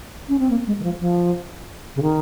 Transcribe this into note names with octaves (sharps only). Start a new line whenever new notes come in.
C#4
C4
A#3
G#3
D#3
F3
F3
C#3
D#3